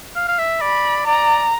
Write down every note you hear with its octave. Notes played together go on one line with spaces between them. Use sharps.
F5
F5
E5
D5 B5
D5 A#5